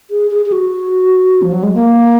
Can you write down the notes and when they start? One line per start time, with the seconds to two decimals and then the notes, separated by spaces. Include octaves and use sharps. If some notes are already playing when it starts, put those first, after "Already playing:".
0.10 G#4
0.31 G#4
0.46 G#4
0.52 F#4
1.42 F3
1.52 F#3
1.63 G#3
1.74 A#3